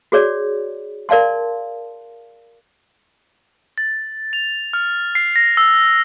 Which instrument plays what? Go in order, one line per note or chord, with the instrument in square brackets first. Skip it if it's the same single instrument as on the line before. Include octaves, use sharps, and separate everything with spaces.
[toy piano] F#4 G#4 C#5 D5
A#4 D5 F5 A5 C6
[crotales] A6
F7
F6
C7
A#6
E6